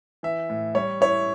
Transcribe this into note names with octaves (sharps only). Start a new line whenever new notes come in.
E3 E5
A2
G3 C#5
E4 C#5